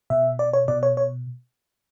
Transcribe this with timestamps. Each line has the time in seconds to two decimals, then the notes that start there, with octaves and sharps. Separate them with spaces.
0.10 B2 E5
0.39 D5
0.53 C#5
0.68 B2 D5
0.83 C#5
0.97 C#5